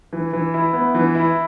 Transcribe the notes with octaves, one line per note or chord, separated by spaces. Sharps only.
E3
E3
E4
B3
E3
E4